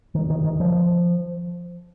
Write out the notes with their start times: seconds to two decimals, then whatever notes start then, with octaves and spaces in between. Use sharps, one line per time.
0.15 D#3
0.30 D#3
0.44 D#3
0.60 F3